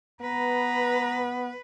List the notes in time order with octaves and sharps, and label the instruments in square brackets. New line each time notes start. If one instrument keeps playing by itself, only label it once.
[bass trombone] B3 [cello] B4 [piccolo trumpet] A#5